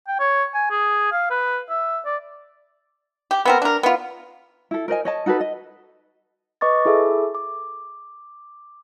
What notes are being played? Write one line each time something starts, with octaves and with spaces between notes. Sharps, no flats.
G5
C#5
G#5
G#4
F5
B4
E5
D5
G4
B3 C4 A#4
D4 A#4
B3 F4
E4 A4
A#4 C5 D#5 G#5
C#5 D#5 A5
D#4 F#4 A4 B4
D#5
B4 D#5 C#6 D6 A6
E4 G#4 A4 E5 D6
D6